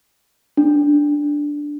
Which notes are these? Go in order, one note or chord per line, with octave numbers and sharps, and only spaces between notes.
D4